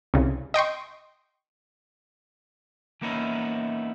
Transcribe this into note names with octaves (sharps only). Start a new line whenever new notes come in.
C2 C#3
D#5 G5 C6 C#6
E3 A#3 B3 C#4 D#4 E4